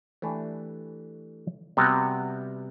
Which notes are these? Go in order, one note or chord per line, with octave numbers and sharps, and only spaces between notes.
E3 A3 D4 G4
C3 G3 B3 F#4